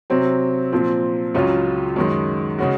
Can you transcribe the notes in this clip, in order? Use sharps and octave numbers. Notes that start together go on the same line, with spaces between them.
C3 F#3 C4
A#2 F3 C4
C#2 C#3 F#3 C#4 F4
F#2 D#3 G#3
C#3 G#3 C#4 F#4